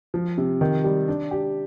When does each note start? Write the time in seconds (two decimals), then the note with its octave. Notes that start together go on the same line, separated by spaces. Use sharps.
0.14 F3
0.38 C3
0.61 D#3
0.84 G3
1.08 D4
1.31 G4